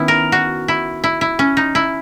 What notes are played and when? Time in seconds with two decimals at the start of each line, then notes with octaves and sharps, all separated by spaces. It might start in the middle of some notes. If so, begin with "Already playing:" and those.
Already playing: D#3 B3 C#4 E4
0.08 A#4
0.32 F#4
0.68 E4
1.04 E4
1.21 E4
1.39 C#4
1.57 D#4
1.75 E4